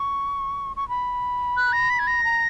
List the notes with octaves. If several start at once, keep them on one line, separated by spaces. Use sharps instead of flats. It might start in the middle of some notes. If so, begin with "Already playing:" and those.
Already playing: C#6
C#6
B5
F#6
A#6
B6
G#6
A#6
A#5